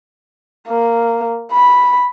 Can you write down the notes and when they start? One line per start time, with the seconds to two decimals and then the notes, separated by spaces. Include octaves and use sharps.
0.68 A#3
1.52 B5